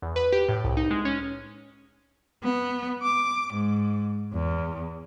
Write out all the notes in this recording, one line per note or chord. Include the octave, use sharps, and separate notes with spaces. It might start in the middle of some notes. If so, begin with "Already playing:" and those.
E2
B4
G4
A2
C2
D#4
G#3
C#4
B3
D6
G#2
E2